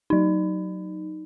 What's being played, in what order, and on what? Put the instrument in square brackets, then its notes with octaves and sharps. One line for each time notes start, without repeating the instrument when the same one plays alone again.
[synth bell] F#3 D#4